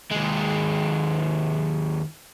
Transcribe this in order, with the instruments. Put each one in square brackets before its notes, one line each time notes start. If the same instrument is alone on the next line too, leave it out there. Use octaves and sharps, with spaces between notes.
[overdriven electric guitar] D#2 G#3